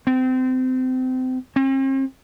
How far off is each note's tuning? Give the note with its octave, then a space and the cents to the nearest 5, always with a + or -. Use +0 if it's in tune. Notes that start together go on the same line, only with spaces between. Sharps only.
C4 -30
C4 +45